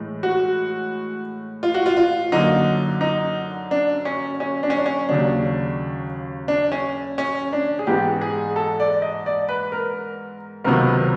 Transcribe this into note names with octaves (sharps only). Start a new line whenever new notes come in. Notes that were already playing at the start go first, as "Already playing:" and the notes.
Already playing: A2 E3 G#3
F#4
F4
F#4
F4
F4
F#2 D3 F#3 A#3 D#4
D#4
D4
C#4
C#4
D4
C#4
D4
C#4
D#2 C#3 F#3 D4
D4
C#4
C#4
D4
G#4
G#2 E3 G#3 B3 G4
G#4
A4
D5
D#5
D5
B4
A#4
C#2 C3 D#3 F#3 B3 A#4